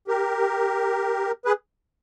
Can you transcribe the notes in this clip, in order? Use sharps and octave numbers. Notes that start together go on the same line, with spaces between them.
G4 A#4
G#4 B4